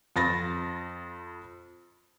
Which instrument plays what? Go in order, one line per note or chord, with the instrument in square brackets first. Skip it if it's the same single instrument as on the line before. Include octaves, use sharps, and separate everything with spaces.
[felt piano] F2 B5 A6 A#6